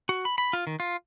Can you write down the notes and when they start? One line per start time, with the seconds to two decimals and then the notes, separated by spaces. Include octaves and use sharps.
0.09 F#4
0.25 B5
0.38 B5
0.53 F4
0.67 D#3
0.80 F4